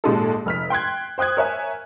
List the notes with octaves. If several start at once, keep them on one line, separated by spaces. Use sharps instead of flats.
G#1 A#2 G#3 D#4 G4 A4
F1 F6 B6
G5 C6 F#6 G#6
C5 G5 D#6 F#6 G#6
A#4 C#5 E5 G#5